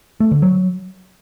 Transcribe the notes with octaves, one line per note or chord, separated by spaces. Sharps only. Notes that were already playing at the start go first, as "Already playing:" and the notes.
A3
D3
F#3